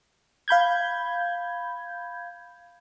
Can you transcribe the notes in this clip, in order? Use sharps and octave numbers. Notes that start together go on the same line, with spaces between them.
F5 B5 G6 G#6